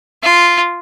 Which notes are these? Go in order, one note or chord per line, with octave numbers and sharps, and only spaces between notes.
F4